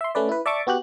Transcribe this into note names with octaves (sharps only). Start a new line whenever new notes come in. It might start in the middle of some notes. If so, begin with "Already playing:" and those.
E5 C6
A3 C#4 B4 D5
E4 B4
D5 E5 A5 C#6 D6
B3 F#4 G4 F#6